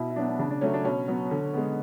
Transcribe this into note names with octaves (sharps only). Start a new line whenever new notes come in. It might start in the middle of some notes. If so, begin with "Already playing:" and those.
Already playing: B2 E4
E4
F#3 B3 D4
D4
C#3 D4
D4
F#3 A3 C#4
D4
B2 C#4
F#3 B3
D3
G#3 B3